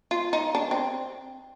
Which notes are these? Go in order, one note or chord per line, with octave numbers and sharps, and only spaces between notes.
F4
D#4
D4
C4